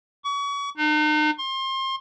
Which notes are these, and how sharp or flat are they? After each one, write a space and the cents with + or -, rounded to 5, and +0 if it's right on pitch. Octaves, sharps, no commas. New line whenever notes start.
C#6 +35
D#4 -40
C6 +30